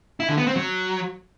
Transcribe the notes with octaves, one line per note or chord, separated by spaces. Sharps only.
E4
D3
B3
C4
F#3